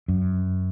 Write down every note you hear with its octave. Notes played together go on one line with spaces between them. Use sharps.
F#2